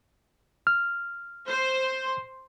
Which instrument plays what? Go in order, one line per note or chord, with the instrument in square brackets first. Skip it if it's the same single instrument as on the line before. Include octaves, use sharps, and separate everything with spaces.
[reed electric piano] F6
[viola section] C5